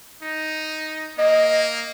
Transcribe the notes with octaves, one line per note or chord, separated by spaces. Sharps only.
D#4
A#3 D#5